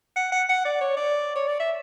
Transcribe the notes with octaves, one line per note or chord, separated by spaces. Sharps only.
F#5
F#5
F#5
D5
C#5
D5
C#5
D5
E5